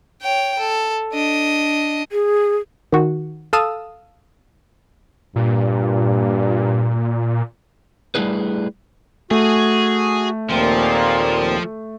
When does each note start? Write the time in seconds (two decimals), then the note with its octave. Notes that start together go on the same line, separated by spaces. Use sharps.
0.21 C#5 G5
0.59 A4
1.13 D4 D#5
2.12 G#4
2.92 D#3 F#4
3.53 A4 F5 A5 D#6 E6
5.36 G2 A#2
8.15 G3 A3 D4 E4 G#4 B4
9.31 A3 F#4 G#4
10.50 D#2 A#2 F3 C4